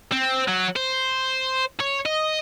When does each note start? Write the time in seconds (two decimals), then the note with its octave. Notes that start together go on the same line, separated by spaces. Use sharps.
0.12 C4
0.48 F#3
0.76 C5
1.80 C#5
2.06 D#5